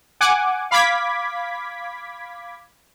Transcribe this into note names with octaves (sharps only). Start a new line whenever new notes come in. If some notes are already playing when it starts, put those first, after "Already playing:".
F#5 G#5 D6
F5 B5 D6 G#6 B6